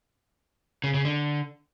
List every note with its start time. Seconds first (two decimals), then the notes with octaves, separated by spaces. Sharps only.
0.84 C#3
0.94 C#3
1.05 D3